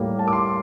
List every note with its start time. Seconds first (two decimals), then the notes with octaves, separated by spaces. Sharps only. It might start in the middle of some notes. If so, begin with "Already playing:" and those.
Already playing: A2 G3 A#3
0.19 A5
0.28 D6
0.33 C6